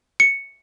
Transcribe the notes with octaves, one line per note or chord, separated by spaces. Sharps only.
C#7